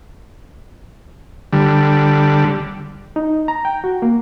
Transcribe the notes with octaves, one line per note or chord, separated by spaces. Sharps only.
D3 G3
D#4
A#5
G5
F#4
A#3